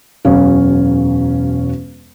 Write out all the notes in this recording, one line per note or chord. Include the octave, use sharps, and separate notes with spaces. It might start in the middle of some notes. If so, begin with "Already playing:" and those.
E1 F#2 C#4 F5